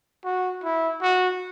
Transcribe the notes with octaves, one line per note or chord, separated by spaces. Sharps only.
F#4
E4
F#4